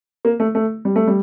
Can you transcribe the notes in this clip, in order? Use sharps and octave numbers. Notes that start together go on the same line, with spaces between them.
A#3
A3
A3
G3
A3
G3